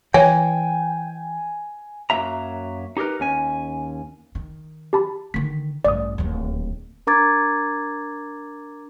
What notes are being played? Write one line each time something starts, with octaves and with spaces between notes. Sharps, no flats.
E3 C#5 G5 G#5
F#2 F#3 A#3 E4 E5 A#5
D#4 G4 G#4 A#4 B4
D#2 C#4 G#5
D#3
G4 A5 B5
D3 D#3 B6
A1 G2 D5 D#6
D1 D#2
D4 A#4 A#5 D6 G#6 A6